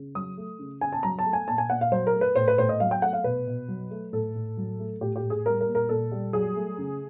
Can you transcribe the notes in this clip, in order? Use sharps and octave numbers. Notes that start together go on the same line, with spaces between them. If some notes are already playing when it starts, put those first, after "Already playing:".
Already playing: C#3
F#3 D#6
A3
C#3
C#3 G#5
A5
F#3 A#5
A5
A3
G#5
A#2 A5
G#5
A#2 F#5
F5
F#3 C5
A#4
A3
B4
A2 C5
B4
A2 C5
D#5
F#3 F5
G5
A3 F#5
F5
B2 B4
B2
F#3
A3
A2 A4
A2
F#3
A3
A2 G4
G4
A2
G#4
G3 A#4
A#4
A#2
A#4
A#2 A4
G3
F#3 G#4
A3
C#3